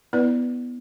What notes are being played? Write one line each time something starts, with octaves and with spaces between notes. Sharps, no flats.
B3 E4 B4 D5